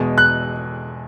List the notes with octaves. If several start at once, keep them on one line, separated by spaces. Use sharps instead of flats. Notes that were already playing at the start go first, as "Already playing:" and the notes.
Already playing: E2 B2 G#3
F#6